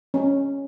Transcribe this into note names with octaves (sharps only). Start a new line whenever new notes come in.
C#4